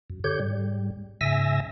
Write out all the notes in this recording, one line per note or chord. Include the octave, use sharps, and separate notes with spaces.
F#2
D3 G4 C#5 G6
G#2 G3
G#2 C#3 E5 G#5 E6 A#6